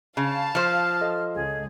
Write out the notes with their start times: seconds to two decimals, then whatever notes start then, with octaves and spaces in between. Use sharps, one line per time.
0.17 C#3 F5 A5
0.55 F3 C5 F6
1.01 A4 D#5
1.34 C#2 G#4